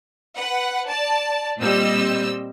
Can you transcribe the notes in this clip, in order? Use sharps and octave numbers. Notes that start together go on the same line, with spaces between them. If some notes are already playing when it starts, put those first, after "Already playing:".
B4 F#5
D5 A5
A#2 G3 C4 D#5 E6